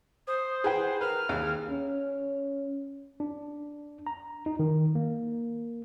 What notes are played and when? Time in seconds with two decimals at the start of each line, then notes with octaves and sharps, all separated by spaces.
0.27 C5 D#6
0.64 G#4 B4 F#5 G5
1.01 A#4 B4 F6
1.29 D#2 G#4
1.70 C#4
3.20 D4
4.07 A#5
4.46 D#4
4.59 D#3
4.95 A#3